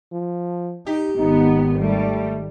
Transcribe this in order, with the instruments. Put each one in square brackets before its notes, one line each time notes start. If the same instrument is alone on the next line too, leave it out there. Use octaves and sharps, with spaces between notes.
[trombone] F3
[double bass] D#4 [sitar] G4
[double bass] G#1 D#3 [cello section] B3 [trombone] D#4
[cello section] G3 [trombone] A3